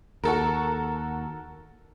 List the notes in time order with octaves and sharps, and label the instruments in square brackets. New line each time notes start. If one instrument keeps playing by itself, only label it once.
[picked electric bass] D#2 [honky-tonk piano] F#4 A4 A#4